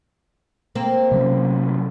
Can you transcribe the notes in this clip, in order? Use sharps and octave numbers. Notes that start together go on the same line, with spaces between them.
A#3 C4
C3 F#3 C#4